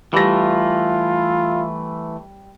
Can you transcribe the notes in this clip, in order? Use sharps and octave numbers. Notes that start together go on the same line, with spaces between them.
E3 G3 A3 F4 A#6